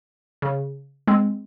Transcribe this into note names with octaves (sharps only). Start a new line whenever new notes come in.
C#3
G#3 C4